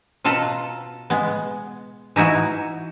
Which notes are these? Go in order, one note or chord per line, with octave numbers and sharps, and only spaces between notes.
B2 F4 A4 B4 A5 A#5
G#3 B3
E3 D#4 E4 F#4